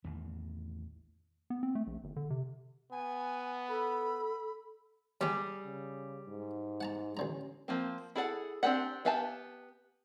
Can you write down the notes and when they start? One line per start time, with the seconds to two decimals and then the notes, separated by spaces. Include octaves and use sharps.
0.04 A1 E2 D#3 E3
1.50 B3
1.63 C4
1.75 A3
1.87 A#1
2.04 G1
2.16 D3
2.30 C3
2.92 B3 G#5
3.69 A4 B5
5.21 D#2 D#3 G3 G#4
5.64 C#3
6.28 G#2
6.81 F#5 A5 A#5
7.17 A1 D3 C#4 A#5
7.68 F3 A#3 C4
8.16 E4 G#4 A4 C5 F#5
8.63 C4 D4 D#4 G4 F#5
9.05 B3 G4 F5 G#5 A5